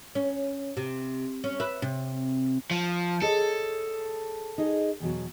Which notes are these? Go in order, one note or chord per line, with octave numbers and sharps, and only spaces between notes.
C#4
C3
C#4
B4 E5
C3
F3
G#4 A4 C#5 D#5
D#4 G#4 D#5
E2 B2 F#3